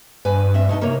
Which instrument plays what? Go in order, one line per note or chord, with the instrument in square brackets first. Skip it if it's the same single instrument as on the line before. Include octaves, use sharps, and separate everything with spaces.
[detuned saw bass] G2 [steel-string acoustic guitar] B4 G#5
[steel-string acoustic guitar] C4 E5
B2 A3 D#4
[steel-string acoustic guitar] C3 C#5 [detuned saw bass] A#3